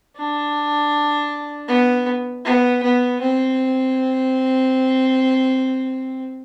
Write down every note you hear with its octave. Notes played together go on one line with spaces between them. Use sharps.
D4
B3
B3
B3
C4